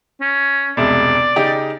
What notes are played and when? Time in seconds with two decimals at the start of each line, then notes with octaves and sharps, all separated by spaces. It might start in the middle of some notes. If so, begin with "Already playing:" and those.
0.21 C#4
0.77 E1 C2 G#3 D5
1.36 C#3 D#4 G4